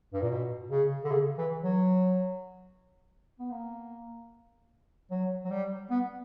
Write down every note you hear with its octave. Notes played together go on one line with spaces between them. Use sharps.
G2
A#2
B2
C#3
D3
C#3
E3
F#3
B3
A#3
F#3
F#3
G3
B3